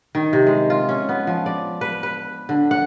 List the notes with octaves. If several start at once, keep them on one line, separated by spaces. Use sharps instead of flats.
D#3
C3
G#3
F4
C#4
B3
F3
D5
B4
B4
D3
F#5